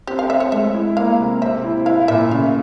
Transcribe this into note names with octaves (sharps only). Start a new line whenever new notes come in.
C4 G4
F5
C4 E5
C#5
G#3 E5
E4
A#3 F5
C3
C4 E5
E4
E4 F5
A#2 E5
C#3 F5